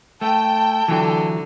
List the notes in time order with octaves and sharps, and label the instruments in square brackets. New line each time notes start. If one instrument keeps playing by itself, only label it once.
[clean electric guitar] A3 [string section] G5 [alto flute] A5
[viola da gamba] D3 [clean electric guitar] E3 F#3